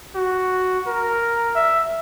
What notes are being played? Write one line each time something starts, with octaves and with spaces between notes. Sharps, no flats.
F#4
A#4
E5